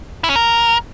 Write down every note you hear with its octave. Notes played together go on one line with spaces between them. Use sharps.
E4
C#4
A#4